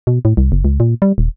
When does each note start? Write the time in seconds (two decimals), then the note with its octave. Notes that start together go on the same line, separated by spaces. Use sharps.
0.07 B2
0.25 A2
0.37 C2
0.52 F#1
0.65 C#2
0.80 A#2
1.02 G3
1.18 D#1